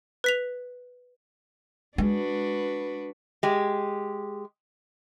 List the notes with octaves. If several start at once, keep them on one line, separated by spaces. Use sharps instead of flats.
B4 B6 F7
G#3 D4 F#4 B4
G#3 G4